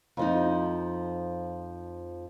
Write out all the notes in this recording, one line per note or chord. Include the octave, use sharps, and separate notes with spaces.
F2 F3 D#4